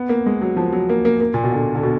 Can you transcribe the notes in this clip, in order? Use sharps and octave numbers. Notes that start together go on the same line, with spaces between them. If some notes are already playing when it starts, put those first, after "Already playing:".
Already playing: B3
A#3
G#3
F#3
F3
F#3
A#3
A#3
A#3
A#2
B2
D3
D3
B2